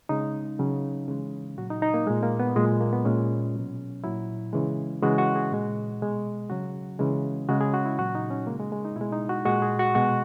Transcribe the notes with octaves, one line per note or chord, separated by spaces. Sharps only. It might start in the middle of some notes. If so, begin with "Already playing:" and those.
C#3 G#3 D#4
C#3 F#3
C#3 E3 G#3
A#2 F#3 F#4
D#4
D#4
A#3
A#2 G#3
A#3
B3
A#2 F#3 G#3
A#3
B3
A#2 G#3 C#4
B2 F#3
A#2 F#3 E4
C#3 E3 G#3
C#3 E3 G#3 F#4
F#4
G#4
A#2 G#3
B2 G#3
C#3 F#3 F#4
C#3 E3 G#3
C#3 G#3 F#4
G#4
F#4
E4
A#2 F#3 F#4
D#4
C#4
C#3 G#3 A#3
G#3
G#3
D#4
B2 G#3 E4
D#4
F#4
A#2 G#3 F#4
G#4
F#4
B2 G#3 F#4